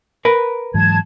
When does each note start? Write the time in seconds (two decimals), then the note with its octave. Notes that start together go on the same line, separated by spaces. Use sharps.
0.25 A#4 B4
0.74 G#2 E3 F#3 A5 G#6